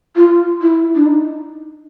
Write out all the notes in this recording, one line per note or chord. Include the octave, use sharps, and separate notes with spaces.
F4
E4
D4
D#4